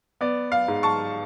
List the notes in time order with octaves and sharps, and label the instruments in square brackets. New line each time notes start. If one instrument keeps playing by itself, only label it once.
[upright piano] B3 D5
F5
G#2
A5 C#6